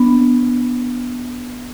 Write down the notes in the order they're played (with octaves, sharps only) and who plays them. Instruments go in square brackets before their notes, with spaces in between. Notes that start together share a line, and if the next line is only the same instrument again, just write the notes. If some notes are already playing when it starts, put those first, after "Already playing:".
Already playing: [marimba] B3 D4